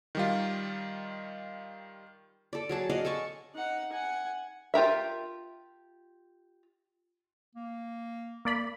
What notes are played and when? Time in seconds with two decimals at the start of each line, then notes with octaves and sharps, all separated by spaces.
0.15 D#3 G3 F4
2.53 A4 D5
2.69 F#3 G#4 A5
2.90 D5 D#5 F5 F#5
3.05 A4 G#5 A5 C#6
3.54 D#4 F#5
3.92 F#5 G#5
4.74 F4 G4 A#4 E5
7.55 A#3
8.45 A#3 D5 B5